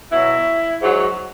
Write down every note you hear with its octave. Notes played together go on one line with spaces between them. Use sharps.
B2 F#3 E4
G#2 F#3